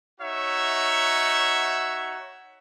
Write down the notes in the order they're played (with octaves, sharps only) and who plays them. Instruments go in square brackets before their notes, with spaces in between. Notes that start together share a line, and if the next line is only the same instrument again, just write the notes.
[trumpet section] D#4 F#4 C#5 E5